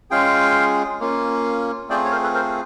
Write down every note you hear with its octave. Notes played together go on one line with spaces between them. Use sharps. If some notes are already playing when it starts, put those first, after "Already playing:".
G#3 C#4 F4 G#4 F5 G5
A#3 C#4 F4
A3 C4 F4 G#4 C5 D5
C#5
A#4 C5
A4 B4
A#4 C5